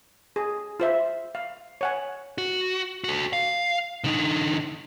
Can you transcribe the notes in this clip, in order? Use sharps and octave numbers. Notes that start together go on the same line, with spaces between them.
G#4
F4 C5 E5
F5
C#5 F#5 G#5
F#4
F#4 A4
F5
D3 D#4